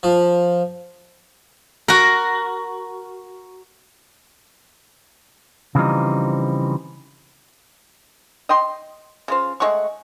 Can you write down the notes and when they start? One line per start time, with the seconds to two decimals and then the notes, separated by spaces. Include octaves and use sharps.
0.03 F3
1.88 F#4 A#4
5.75 C#3 E3 F3 G3 C4 D#4
8.49 D#5 G5 C6
9.28 C#3 F4 C5
9.60 G#3 A3 F#5 C#6